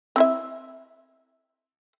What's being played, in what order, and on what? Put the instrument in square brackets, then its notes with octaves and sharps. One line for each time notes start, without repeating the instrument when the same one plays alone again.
[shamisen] C4 E4 E5